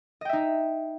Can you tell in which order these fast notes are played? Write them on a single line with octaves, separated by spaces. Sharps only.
D#5 G5 E5 D#4